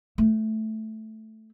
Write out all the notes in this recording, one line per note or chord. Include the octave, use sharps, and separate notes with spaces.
A3